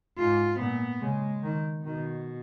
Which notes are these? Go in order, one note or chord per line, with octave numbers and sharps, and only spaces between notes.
G#2 F4
A#2 B3
C#3 G#3
D#3
B2 D#3